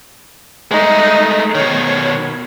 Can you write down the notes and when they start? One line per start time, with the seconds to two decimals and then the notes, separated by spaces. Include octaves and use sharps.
0.71 G#3 A3 D#4
1.55 B2 D#3 C#5